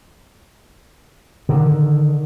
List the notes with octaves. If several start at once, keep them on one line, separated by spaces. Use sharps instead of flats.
D3 D#3